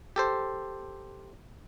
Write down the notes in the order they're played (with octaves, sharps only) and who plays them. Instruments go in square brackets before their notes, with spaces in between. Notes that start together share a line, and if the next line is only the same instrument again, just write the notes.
[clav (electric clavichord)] G4 A4 C5